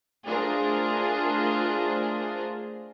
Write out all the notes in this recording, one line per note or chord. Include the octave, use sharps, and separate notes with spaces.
A3 D4 F4 G#4 A#4 C5